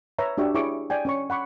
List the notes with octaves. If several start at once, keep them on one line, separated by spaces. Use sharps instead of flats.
B4 C#5 E5 A#5
D4 F#4 G4 E5 C#6
E4 G#4 C#5 C#6 D6
D5 G5 G#5
C#4 C#5 C#6
F#5 B5 C#6 D6